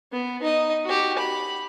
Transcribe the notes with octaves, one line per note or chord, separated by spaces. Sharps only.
B3
D#4 D#5
F#4 G4
B5